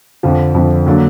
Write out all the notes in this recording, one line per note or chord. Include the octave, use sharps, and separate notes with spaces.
F2 D3 F3
F2 D3 F3
D3 F#3 A#3 D4